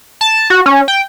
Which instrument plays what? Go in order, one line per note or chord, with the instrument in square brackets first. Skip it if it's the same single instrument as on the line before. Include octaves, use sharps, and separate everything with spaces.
[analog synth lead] A5
F#4
C#4
G5